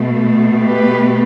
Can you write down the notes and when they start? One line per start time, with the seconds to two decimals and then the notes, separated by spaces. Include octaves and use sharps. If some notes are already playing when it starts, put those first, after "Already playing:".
Already playing: B2 A3
0.63 G4 B4